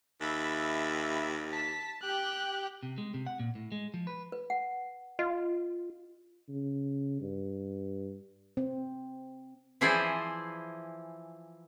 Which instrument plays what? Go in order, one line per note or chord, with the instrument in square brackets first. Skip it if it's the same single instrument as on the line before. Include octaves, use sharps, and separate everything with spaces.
[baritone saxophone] D#2 [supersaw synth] E5 B5
[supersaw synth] A5 [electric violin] B6
[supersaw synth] G4 [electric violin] G5 F#6
[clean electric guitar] C3
G#3
C3
F#5
A#2
A2
G#3
F3
B4
[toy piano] B4
F#5
[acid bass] F4 [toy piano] D#5
[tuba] C#3
G2
[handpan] C4
[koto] E3 F3 E4 G#4 C5 D5